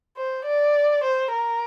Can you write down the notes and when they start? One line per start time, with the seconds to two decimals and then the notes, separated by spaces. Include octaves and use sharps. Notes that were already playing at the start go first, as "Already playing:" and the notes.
0.17 C5
0.46 D5
1.04 C5
1.33 A#4